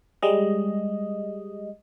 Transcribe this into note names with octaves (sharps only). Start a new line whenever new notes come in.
G3 G#3 D#5